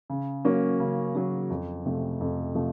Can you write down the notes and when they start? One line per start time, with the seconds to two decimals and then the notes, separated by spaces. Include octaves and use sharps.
0.10 C#3
0.45 F#3 A#3 C#4
0.80 C#3
1.15 F#3 A#3 C#4
1.50 F2
1.86 C3 F3 A3
2.20 F2
2.55 C3 F3 A3